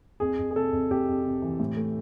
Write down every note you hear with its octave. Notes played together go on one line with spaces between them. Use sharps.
F2 G#4
F2
G#4
C3 A4
F2
F2 G4
F2
C3
E3
A2
A3